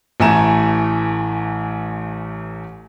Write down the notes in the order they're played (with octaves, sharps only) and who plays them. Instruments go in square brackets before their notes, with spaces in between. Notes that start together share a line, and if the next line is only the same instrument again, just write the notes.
[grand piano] A1 E3 A3 G#5 A#5 E7